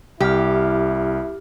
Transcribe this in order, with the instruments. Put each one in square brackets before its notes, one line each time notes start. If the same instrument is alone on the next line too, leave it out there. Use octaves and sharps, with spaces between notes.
[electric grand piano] C2 F6 [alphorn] E4 [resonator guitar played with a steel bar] G4